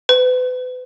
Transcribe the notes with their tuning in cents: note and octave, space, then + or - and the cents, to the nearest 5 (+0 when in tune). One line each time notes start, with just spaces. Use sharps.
B4 +35